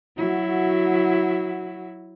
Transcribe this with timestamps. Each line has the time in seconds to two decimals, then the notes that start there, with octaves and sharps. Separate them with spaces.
0.17 F#3 E4 F#4